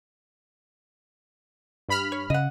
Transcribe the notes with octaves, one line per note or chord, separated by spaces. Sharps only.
G2 B5 F6
C#5
C#3 D#5 F#5